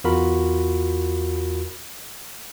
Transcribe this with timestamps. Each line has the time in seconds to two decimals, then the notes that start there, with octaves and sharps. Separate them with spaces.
0.04 E2 F4 F#4 A#4 B5